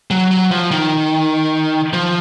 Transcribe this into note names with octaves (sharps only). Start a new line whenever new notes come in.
F#3
F#3
F3
D#3
F3